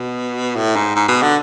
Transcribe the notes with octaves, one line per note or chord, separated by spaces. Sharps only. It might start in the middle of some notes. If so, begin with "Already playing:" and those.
Already playing: B2
A2
G#2
G#2
B2
D3